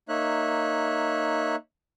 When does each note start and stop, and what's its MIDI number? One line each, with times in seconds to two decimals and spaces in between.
0.09 1.56 58
0.09 1.56 63
0.09 1.56 73
0.09 1.56 76
0.09 1.56 90